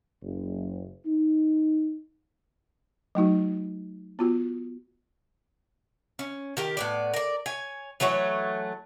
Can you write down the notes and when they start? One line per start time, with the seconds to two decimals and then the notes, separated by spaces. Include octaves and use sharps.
0.22 F#1
1.06 D#4
3.15 F#3 A3 D#4 F#4
4.19 B3 F4 F#4
6.19 C#4
6.57 D#3 G4 A#4
6.77 A2 B3 D5
7.14 A#4 D5
7.46 C#5 G#5
8.00 E3 F#3 A3 C#5